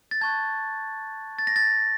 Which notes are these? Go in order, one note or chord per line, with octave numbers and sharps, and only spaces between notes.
A6
A5 C#6 F#6 G#6
A6
A#6
A6